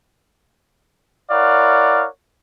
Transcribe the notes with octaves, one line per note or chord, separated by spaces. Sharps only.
E4 A#4 C#5 D5 F5 F#5